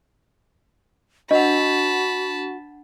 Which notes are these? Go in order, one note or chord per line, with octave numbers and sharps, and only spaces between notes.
D4 F#4 D#5 F#5 A5 B5